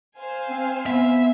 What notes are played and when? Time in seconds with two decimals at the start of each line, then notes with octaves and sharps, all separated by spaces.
0.18 C5 F5 G#5
0.49 C4
0.86 B3 E5